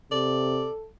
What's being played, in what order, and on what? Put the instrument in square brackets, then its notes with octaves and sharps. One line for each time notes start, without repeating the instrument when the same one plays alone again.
[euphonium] C3 [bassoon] A4 [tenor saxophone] D5